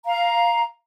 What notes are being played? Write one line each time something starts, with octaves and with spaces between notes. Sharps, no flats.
F5 A#5